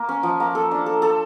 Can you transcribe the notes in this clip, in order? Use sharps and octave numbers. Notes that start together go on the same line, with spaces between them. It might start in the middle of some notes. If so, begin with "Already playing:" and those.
Already playing: A#3
C#4
F3
A#3
A4
D4
A4
A4